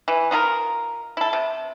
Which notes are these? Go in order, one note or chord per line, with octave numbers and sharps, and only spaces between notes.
E3
D#4 F4 G#4 A#4
E4 A4
C3